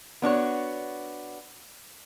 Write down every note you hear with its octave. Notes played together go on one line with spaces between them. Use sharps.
B3 D4 F#4 C#5